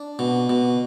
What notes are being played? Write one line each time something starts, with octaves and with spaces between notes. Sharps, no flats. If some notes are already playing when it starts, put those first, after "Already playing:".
Already playing: D4
B2
B2